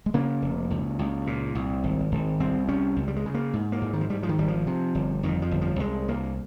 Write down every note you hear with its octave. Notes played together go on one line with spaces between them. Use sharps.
G#3
C#3 A#3
F1
C#2
C#2
A#2
C2
G#1
G#1
C2 C4
C3 C#4
C#2
G3
G#3
C#3
A#3
G#2
A#3
G#2
D#3
F3
G#2 G3
F3
D#3
G#1 G3
F3
C3
G1
F2 D#3
F3
G1
F3
C2 G#3
C2 A#3